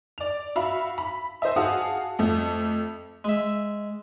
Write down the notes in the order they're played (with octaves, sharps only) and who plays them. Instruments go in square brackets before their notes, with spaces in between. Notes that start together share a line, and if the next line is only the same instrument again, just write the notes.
[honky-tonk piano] D5 F7
F#4 E5 F5 B5
B5
C5 D#5 E5
F#4 G#4 F5 F#5 A5 D#6
F2 A3
[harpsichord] G#3 E5